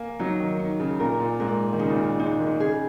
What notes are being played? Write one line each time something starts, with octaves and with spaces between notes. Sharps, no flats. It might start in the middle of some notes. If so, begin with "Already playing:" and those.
Already playing: A#3 G#5
F#3 D#4
D#3
D#4
C#3
A#2 A#4
A#2
G#2 A#4
D#3
C#3 D#4
A#2
C#3
G#3 D#4
D#3
C#3 G#4